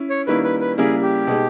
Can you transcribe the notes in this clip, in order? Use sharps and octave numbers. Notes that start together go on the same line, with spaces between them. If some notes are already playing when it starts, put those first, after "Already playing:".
Already playing: C#4 E4
C#5
D#3 G3 A#3 C#4 E4 B4
B4
B4
C#3 G3 A#3 E4 G#4
G4
B2 G#3 D#4